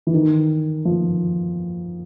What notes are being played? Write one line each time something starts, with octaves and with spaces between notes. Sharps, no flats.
E3
D#3
F3